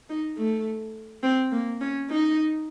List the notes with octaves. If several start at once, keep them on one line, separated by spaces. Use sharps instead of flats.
D#4
A3
C4
A#3
C#4
D#4